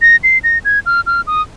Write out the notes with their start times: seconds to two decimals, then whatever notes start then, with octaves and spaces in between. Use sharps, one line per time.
0.02 A#6
0.24 C7
0.44 A#6
0.65 G#6
0.86 F6
1.07 F6
1.27 D#6